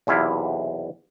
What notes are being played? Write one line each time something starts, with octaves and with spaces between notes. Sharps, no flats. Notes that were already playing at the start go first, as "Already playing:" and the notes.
B1 E2 C3 E4 F5